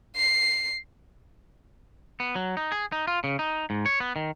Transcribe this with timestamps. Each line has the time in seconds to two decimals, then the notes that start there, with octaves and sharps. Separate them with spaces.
0.16 C7
2.20 B3
2.35 F#3
2.57 D#4
2.72 G#4
2.92 D#4
3.08 F4
3.24 C#3
3.39 D#4
3.70 G#2
3.86 C#5
4.00 B3
4.16 D#3